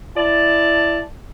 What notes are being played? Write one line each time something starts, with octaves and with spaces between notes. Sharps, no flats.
E4 D5 A5